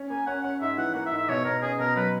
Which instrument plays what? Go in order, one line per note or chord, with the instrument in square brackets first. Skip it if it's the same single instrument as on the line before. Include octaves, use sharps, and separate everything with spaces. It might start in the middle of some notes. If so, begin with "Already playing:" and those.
Already playing: [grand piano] C#4
[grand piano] A#3 [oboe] G#5
[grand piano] C#4 [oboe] F#5
[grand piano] C#4 [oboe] F#5
[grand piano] G#2 [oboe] E5
[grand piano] E3 [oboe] F#5
[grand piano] A#3 [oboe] F#5
[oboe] E5
[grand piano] G#2
[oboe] E5
[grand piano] B2 [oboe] C#5
[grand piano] B2 [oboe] A#4
[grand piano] C#4 [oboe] G#4
[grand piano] B2 [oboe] A#4
[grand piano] F#3 [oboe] B4